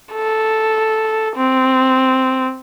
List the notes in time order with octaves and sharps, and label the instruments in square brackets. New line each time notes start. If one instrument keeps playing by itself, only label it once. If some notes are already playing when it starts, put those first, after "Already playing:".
[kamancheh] A4
C4